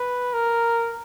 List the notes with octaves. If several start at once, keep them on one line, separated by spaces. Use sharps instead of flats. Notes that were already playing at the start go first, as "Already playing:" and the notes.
Already playing: B4
A#4